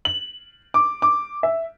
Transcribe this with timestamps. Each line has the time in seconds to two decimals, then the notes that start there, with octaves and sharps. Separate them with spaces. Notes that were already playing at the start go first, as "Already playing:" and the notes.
0.05 F#7
0.74 D6
1.02 D6
1.43 E5